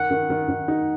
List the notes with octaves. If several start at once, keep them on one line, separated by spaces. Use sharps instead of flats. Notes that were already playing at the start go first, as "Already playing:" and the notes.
Already playing: D#3 F#5
D#3
D#3
D#3
D#4